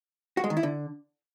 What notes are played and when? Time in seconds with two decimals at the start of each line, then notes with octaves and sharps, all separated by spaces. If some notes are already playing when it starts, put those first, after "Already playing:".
0.37 F#4
0.44 G#3
0.50 D#3
0.57 E4
0.63 D3